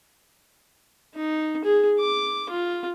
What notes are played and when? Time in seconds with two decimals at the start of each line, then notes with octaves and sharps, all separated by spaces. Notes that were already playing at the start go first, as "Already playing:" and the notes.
1.15 D#4
1.64 G#4
1.99 D6
2.49 F4